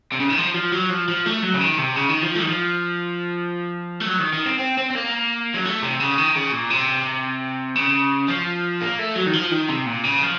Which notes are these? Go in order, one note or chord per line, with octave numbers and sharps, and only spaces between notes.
C3
C#3
D#3
F3
F3
F#3
F3
F3
A3
F#3
C#3
D#3
C3
C#3
D#3
F3
A3
D#3
F3
A3
F#3
D#3
D#3
C4
C4
C4
C4
A#3
F#3
A3
C3
C#3
D#3
C#3
A#2
C3
C#3
F3
A#3
A3
F#3
D#3
F3
D#3
C3
A#2
C#3
F3